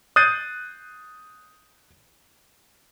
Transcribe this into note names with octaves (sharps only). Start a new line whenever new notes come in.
D#6 F#6 G6 A6 C7 D#7